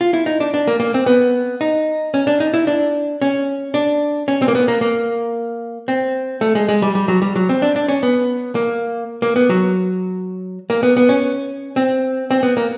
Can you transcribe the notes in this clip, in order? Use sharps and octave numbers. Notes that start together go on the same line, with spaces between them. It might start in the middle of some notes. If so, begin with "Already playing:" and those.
F4
E4
D#4
D4
D4
A#3
A#3
C4
B3
D#4
C#4
D4
D#4
E4
D4
C#4
D4
C#4
C4
A#3
B3
A#3
A#3
C4
A3
G#3
G#3
G3
G3
F#3
G3
F#3
C4
D4
D4
C#4
B3
A#3
A#3
B3
F#3
A#3
B3
B3
C#4
C4
C4
B3
A#3